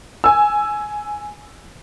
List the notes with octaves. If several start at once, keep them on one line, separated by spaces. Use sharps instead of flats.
G#5 E6